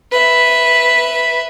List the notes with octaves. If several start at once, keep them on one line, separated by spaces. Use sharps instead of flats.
B4 E5